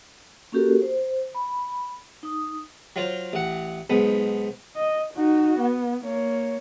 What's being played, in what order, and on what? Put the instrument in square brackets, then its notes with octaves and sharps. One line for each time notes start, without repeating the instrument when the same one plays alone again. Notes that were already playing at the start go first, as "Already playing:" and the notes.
[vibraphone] A#3 C#4 F#4 G4 A4 A#4
C5
B5
D#4 D#6
[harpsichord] F#3 F4 C5
A1 F#5
B1 G#2 B3
[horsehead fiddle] D#5
D#4 F#4
B3
A#3 C#5